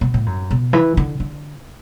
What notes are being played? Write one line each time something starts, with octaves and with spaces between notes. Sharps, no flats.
B2
A2
F#2
B2
E3
D3
D3